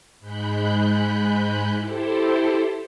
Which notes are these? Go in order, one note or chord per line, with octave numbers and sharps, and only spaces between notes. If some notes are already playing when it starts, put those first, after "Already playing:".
G#2 G#3 B5 F#6 G6
E4 G4 A4 C5